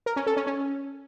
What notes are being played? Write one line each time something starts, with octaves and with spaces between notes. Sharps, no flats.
A#4
C#4
A4
C#4
C#4